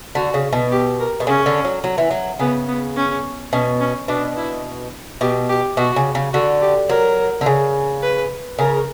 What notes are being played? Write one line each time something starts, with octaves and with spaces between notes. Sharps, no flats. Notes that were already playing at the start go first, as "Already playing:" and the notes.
D3 F#4
C#3
B2
G4
A#4
B2
C#3 C#4
D3
F#3
F#3
E3
F#3
C#3 B3
B3
C#4
B2 C#4
C#4
B2 D4
E4
B2 G4
G4
B2 F#4
C#3
C#3
D3 F#4
G4
F#3 A#4
D3
C#3
B4
C#3 A#4